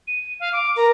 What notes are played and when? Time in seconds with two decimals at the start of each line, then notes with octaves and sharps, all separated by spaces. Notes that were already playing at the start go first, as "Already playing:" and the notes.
0.07 D#7
0.40 F5
0.53 D6
0.77 A#4 A#5